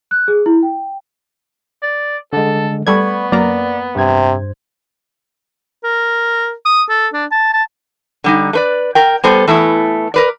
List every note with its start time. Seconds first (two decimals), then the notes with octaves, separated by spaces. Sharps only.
0.11 F#6
0.28 G#4
0.46 E4
0.63 G5
1.83 D5
2.33 D3 G#3 A4
2.87 G3 A3 B3 D5 B5 C#6 G#6
3.32 F#2 A#3 D5 A#5
3.96 G2 C3 C5 G#6
5.84 A#4
6.66 D#6
6.90 A4
7.14 D4
7.31 A5
7.54 A5
8.24 D3 G3 D#4
8.53 A3 B4 D5
8.95 A#4 G5
9.24 G3 B3 A4 C5
9.47 E3 A3 B3 E4
10.14 A#4 B4 D5